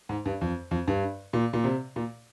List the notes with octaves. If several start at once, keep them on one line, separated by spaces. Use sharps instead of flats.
G#2
G2
F2
F2
G2
A#2
A#2
C3
A#2